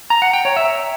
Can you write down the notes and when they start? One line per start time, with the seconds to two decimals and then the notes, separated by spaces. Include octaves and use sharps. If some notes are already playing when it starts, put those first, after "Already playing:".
0.10 A#5
0.22 F#5
0.33 G5
0.45 C#5
0.56 E5